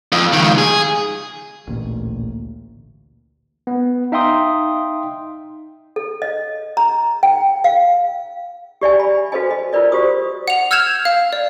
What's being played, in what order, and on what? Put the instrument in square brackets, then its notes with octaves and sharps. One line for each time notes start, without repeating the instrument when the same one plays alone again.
[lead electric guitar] F2
C#2 D#3
G#4
[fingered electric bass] A1 D2 A#2
[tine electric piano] B3
D#4 E5 F5 G5 C6 D#6
[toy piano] A4
D#5
A#5
G5
F5
G4 D5 E5 G#5
B5
F#4 A4 B4 C5 D#5 G#5
D#5
F4 A#4 B4 D5 D#5
F#4 G4 C5 D#6
[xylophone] F#5 F7
E6 F6 G6 G#6 E7 F7
F5
D5